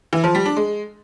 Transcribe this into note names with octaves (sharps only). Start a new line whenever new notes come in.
E3
F3
G3
D4
G#3